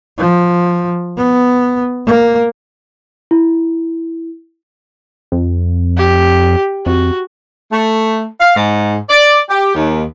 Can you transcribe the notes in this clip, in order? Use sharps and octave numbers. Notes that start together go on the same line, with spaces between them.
F3
B3
A#3
E4
F2
G4
F2 F#4
A3
F5
G#2
D5
G4
D#2